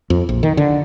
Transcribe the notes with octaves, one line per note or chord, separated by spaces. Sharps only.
F2
A#1
D#3
D3